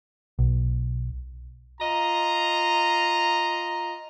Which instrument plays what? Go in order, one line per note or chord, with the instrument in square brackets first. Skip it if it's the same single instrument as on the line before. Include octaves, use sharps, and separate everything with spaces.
[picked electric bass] B1
[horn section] F4 D#5 A#5